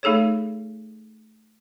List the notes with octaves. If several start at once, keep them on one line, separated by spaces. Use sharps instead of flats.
A3 D#4 G#4 A4 C#5